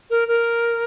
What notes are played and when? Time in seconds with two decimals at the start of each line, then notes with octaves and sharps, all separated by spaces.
0.10 A#4
0.28 A#4